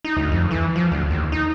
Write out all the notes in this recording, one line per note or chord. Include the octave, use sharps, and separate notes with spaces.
D#4
D2
F2
E3
F3
D2
D#2
D#4